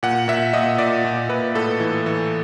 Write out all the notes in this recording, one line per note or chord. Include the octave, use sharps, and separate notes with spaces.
A#2 F#5
A#2 E5
A#2 D#5
A#2 D5
A#2
A#2 B4
A2 A4
E3
E3